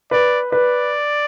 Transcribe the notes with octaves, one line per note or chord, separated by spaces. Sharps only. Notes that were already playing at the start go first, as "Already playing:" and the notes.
B4 D5
B4 D5